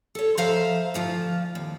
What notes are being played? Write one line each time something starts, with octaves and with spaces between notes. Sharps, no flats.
A4 C#5
F3 C5 E5 F5 A#5
D2 F3 F4
D#2